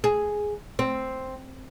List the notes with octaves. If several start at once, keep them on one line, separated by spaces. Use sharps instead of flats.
G#4
C4